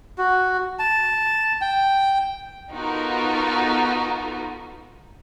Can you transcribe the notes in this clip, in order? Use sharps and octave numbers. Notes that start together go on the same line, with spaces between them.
F#4
A5
G5
B3 D#4 F4 F#4 A4 A#4